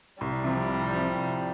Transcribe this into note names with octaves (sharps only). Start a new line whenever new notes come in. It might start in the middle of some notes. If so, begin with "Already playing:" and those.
C2 G3
C3 F3
C2
C3 F3
C2